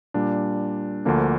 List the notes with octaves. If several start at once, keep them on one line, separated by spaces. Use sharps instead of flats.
A#2 G3 D4
D2 D3 F3 A#3 D4